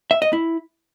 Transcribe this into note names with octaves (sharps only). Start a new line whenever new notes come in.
E5
D#5
E4